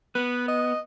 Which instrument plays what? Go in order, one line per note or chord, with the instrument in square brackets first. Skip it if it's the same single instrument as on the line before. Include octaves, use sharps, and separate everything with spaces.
[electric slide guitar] B3 [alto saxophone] B4
[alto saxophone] D#5